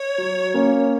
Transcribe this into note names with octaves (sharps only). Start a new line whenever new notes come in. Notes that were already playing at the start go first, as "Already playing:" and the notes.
Already playing: C#5
F#3
A#3 C#4